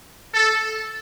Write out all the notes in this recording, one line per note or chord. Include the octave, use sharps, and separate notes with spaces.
A4